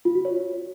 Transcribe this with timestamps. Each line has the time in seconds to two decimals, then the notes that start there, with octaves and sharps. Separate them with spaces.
0.05 F4
0.15 F#4
0.25 C#5